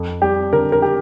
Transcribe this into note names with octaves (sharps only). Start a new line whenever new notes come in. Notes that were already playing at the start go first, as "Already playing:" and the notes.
Already playing: F2
G3 G4
D3 A#4
A#4
G4